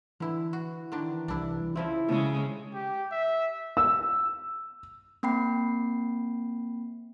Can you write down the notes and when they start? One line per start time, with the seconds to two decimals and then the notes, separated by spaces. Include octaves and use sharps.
0.20 D3 E3 E4
0.53 F#4
0.92 D3 D#3 D4
1.28 C2 D4 E4
1.76 C#3 F3 C4 E4
2.09 C#3 G#3 A4 E5
2.74 G4
3.12 E5
3.77 E6
5.23 A#3 C4 G5 B5 C7